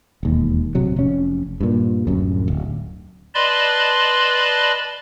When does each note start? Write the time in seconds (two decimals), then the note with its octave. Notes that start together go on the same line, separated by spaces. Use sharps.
0.23 E1 D#2
0.75 D1 C3 F#3
0.96 F1 C#4
1.60 G2 A#2
2.07 D1 F#2
2.48 D1
3.34 B4 D5 D#5 A5 B5 C6